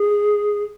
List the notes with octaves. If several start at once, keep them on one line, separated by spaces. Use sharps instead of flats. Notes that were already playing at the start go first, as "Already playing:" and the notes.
Already playing: G#4